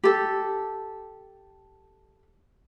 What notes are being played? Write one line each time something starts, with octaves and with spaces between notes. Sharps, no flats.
G4 A4